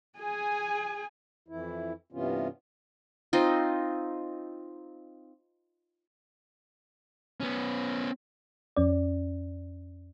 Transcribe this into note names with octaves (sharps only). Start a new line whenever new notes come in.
G#4 G#5
F2 E3 E4
G2 C3 E3 B3 C#4 F4
C4 D#4 F4
B3 C#4
F2 C#4 D5